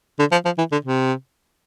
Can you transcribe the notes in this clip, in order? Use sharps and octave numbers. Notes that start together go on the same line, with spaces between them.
D3
F3
F3
E3
D3
C3